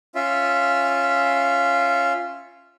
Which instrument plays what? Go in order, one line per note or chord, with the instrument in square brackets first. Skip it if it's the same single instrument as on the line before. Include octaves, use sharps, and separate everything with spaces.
[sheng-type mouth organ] C#4 F4 E5